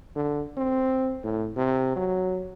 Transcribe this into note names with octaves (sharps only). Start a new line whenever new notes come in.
D3
C4
A2
C3
F#3